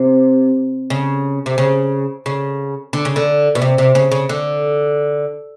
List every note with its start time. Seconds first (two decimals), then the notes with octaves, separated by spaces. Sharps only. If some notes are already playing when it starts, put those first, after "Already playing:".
Already playing: C3
0.90 C#3
1.46 C3
1.58 C#3
2.26 C#3
2.93 D3
3.05 C#3
3.16 D3
3.55 B2
3.62 C3
3.78 C3
3.95 C#3
4.12 C#3
4.29 D3